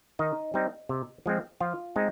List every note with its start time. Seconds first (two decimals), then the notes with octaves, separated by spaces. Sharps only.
0.19 D#3 D#4 D#5
0.54 G3 C4 D#4
0.89 C3
1.26 F3 G#3 C4
1.60 F3 F4 F5
1.96 G#3 C4 D#4